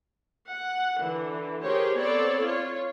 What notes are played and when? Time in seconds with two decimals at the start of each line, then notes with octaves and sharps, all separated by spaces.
0.48 F#5
0.98 D3 E3
1.64 G4 G#4 A#4 C5 C#5
1.97 B3 C4 A4 C#5 D5
2.44 F4 C#5